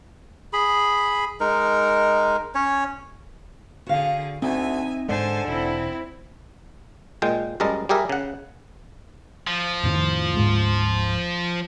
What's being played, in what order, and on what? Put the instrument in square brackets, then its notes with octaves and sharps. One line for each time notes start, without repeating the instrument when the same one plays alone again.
[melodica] G#4 B5
G#3 D#4 A#4
C#4 C#5
[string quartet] D3 G#4 [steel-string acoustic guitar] F#4 F5
[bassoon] D2 [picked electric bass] C4 [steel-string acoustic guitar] D#4 [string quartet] E5 G#5
[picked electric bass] G#2 G#3 [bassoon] D3 [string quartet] C5 G#5 A5
[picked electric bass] E1 [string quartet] C4 E4
[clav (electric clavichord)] A#2 G#3 G5
F#2 G3 G#3 A#4 D#5 A5
G3 G4 G#4 A#4 E5
C#3 F#5
[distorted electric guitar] F3
[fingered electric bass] F2 A2 D#3
D1 G#2 G#3